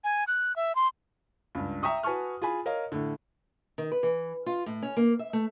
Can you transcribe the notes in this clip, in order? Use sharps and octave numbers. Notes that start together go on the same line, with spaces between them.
G#5
F#6
E5
C6
C#2 G2
E5 G5 A#5 C#6 D#6
F#4 B4 G#5 A5 C#6 F6
F4 G#4 G#5 B5
A#4 C#5 D#5 F5
A2 D3
D#3
B4
E3
F4
A2
C#4
A#3
E5
A3